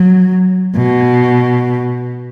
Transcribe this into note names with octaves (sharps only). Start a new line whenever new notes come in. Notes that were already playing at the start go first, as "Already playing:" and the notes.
Already playing: F#3
B2